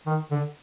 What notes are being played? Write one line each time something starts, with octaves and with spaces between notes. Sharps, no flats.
D#3
D3